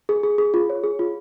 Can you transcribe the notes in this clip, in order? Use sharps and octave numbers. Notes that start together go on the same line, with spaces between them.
G#4
G#4
G#4
F4
C#5
G#4
F4